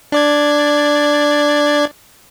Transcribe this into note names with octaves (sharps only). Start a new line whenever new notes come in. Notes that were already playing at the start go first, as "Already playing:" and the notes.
D4 D5 G#6